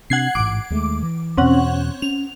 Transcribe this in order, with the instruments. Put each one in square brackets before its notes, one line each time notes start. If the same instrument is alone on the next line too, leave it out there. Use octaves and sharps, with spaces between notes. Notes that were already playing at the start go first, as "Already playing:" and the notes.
[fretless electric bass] C3 C4 D4 [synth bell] F#5 G#6 C7
[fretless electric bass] A1 G#2 [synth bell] D6
[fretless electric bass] D#2 G#3 A3
E3
[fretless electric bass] E2 B2 [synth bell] C4 C#4 F#5
[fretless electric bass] C#4 [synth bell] F7